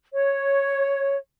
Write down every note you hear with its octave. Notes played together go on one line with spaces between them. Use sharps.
C#5